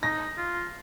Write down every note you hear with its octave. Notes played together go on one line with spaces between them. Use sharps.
D#4 A#6
F4